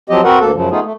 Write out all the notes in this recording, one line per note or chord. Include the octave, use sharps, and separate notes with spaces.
F3 F#3 C4 G4 D#5
C4 F#4 A#4 B4 F#5
D2 A#3 A4
F#2 C#3 F3
A3 B3 D#4 F4 G#4
A3